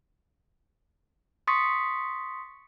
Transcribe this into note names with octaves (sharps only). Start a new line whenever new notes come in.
C6 C#6 D#6 A6 B6 C#7